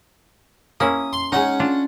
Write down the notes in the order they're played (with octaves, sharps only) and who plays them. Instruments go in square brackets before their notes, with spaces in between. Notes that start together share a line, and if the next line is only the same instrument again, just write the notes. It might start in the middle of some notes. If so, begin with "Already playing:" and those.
[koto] A#3 C#4 E4 [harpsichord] D#6
[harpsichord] C6
[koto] G#3 D#4 [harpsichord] C#4 F#5
[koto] D4 F4 D5